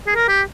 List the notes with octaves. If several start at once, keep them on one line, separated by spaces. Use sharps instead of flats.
G#4
A#4
G4